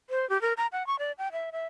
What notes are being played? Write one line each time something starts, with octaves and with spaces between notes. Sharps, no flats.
C5
G4
A#4
A#5
F#5
C#6
D5
G5
E5
E5